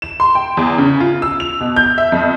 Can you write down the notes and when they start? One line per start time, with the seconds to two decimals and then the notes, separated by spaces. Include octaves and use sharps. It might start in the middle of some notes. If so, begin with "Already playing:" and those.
0.02 E7
0.20 C6
0.35 G5
0.57 E2
0.78 C#3
1.00 F4
1.22 E6
1.40 F7
1.60 B2
1.76 G6
1.98 E5
2.12 F2